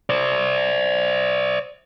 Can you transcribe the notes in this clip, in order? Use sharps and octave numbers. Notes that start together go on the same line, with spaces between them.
C5 D5